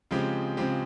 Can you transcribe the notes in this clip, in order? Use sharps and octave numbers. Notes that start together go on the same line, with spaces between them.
C#3 F3 G#3 C4 G4
C#3 F3 G#3 C4 G4